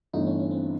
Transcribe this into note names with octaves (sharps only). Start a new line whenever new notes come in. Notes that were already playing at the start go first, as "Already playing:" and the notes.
G1 G2 E3 A3 D#4
C#4
C#4
C4